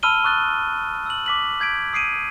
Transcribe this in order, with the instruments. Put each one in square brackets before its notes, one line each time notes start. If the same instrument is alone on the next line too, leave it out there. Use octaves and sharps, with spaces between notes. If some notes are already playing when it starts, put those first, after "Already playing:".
[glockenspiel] A5 B5 E6 F6 D#7 G7
C#6 D#6 F#6 A6 G7
E6 F#7
D6 B6 F#7
G6 G#6 B6 D7
D#6 C7 D7 D#7